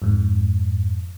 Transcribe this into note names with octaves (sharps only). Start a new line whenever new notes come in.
F2 G#2